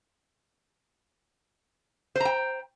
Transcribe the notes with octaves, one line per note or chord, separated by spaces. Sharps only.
C5 G5 A#5